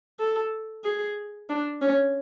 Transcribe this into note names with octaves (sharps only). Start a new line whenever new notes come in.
A4
G#4
D4
C#4